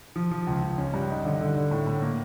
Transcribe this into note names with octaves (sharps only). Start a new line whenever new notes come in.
F3
F3
C#2
C#2
C#4
G2
D#4
D3
D3
D3
A2
A2
A#3